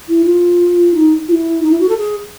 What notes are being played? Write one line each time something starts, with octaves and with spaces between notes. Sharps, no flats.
E4
F4
D#4
F4
E4
D#4
E4
F#4
A4
G#4